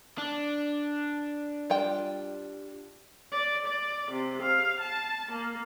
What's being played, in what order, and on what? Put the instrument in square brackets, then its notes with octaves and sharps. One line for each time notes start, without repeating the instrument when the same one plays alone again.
[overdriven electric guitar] D4
[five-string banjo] G3 F4 G5
[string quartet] D5
D5
C3
F5
A5
A#3